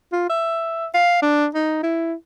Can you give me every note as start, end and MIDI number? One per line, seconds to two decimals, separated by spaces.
0.12 0.25 65
0.30 0.86 76
0.94 1.21 77
1.22 1.47 62
1.54 1.79 63
1.83 2.13 64